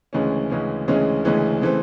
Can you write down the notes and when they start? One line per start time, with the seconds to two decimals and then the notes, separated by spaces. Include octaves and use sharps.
0.13 D2 C#3 E3 G#3 C#4
0.50 D2 C#3 E3 G#3 C#4
0.88 D2 C#3 E3 G#3 C#4
1.25 D2 C#3 E3 G#3 C#4
1.62 C#3 E3 A3 C4